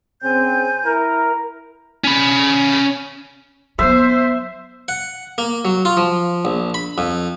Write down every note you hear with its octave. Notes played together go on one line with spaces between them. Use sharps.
C#3 C4 G#5 G6
E4 A#4
C#4 B5
F#3 B3 C5 E5
F#5
A#3
F#3
F4
F3
A#1
B5
F2